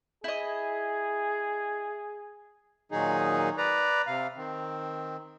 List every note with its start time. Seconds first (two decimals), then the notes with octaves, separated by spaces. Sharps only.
0.24 E4 G#4 D#5
2.92 A#2 D#3 F#3 D#4 G#4
3.58 B4 D5 A#5
4.07 C3 F5
4.37 D#3 C4